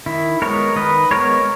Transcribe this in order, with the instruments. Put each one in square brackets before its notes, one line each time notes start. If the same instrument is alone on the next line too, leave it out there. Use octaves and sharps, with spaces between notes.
[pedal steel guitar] D#3 E4
G#3 B3 A#4 C#5
D#3 B4 D#5
G#3 B3 A#4 C#5